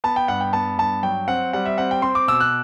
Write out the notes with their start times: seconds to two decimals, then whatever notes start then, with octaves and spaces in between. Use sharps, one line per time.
0.04 B3 A5
0.16 G5
0.28 G2 F#5
0.41 G5
0.53 B3 A5
0.78 G2 A5
1.03 F#3 G5
1.28 C4 F#5
1.53 G3 F#5
1.65 E5
1.78 C4 F#5
1.91 G5
2.02 C4 C6
2.15 D6
2.28 B2 E6
2.40 F#6